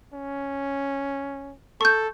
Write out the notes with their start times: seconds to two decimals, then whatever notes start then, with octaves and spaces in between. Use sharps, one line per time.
0.13 C#4
1.81 A4 C#6 G6